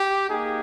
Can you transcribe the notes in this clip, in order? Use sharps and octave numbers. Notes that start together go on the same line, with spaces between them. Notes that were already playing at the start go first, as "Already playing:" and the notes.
Already playing: G4
A#3 D#4 G4 G#4